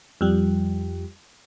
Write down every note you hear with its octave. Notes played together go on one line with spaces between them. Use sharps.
F2 G3